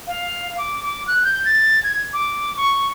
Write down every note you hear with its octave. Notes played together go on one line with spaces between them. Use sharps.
F5
D6
D6
F#6
G6
A6
G#6
D6
C#6